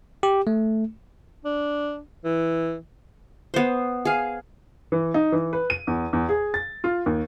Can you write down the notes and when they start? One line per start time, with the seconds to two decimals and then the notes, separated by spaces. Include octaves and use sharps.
0.23 G4
0.47 A3
1.45 D4
2.25 E3
3.54 B3 C5
4.05 G#4 F5
4.92 E3
5.14 D#4
5.32 E3
5.53 B4
5.70 D#7
5.87 E2
6.13 E2
6.29 G#4
6.54 A6
6.84 F4
7.06 D#2